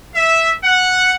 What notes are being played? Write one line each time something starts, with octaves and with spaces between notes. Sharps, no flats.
E5
F#5